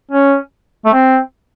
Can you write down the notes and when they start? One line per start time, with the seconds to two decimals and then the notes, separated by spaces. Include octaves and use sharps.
0.11 C#4
0.85 A3
0.93 C4